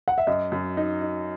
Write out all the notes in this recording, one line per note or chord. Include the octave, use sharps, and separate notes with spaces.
F#5
E5
F#2 D#5
F#2
D#4
D#4